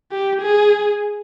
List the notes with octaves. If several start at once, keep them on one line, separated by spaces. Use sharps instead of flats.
G4
G#4